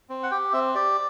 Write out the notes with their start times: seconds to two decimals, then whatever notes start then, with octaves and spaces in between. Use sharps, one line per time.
0.09 C4
0.23 F#5
0.31 G4 G5
0.53 C4 E5
0.75 G4 D5